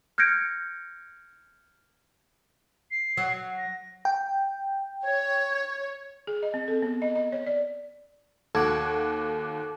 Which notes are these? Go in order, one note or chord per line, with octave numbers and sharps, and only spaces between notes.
F6 G6 G#6 A#6 C#7 D7
C7
F#3
A#6
G5
C#5 G#6
G#4
D#5
C4
A4
B3
D#5
D#5
C#5
D5
D#2 F#4 A4 D6 F#6 G#6